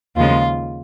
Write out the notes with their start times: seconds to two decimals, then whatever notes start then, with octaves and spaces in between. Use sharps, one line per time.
0.16 D#2 C#3 F3 G#3 F4